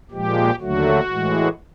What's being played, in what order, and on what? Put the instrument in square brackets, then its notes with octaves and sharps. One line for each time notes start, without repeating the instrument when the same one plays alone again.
[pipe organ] A#2 F3 G#3 G4
D#2 D3 F#3 A3 F#4
A2 E3 G#3